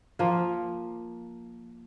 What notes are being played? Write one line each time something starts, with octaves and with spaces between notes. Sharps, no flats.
F3 A#3